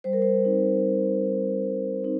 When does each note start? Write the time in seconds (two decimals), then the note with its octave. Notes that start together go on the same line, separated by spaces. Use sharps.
0.04 G3 C5
0.13 A#4
0.22 C5
0.45 C4 D#4
0.84 G3
1.24 C4 D#4
1.63 G3
2.04 C4 D#4